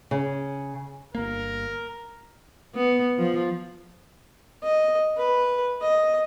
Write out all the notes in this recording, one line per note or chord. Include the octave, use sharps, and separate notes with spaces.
C#3
G1 A#3 A#4
B3
F3
D#5
B4
D#5